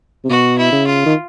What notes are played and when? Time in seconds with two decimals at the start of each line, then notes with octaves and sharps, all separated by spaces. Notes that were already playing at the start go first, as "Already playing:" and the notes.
0.25 C3
0.30 B2 F#4
0.58 E4
0.72 C#3
0.87 F4
1.06 D#3